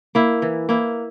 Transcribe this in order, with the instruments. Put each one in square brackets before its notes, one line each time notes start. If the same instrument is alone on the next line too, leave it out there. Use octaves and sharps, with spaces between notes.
[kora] A#3 E4
E3
A#3 E4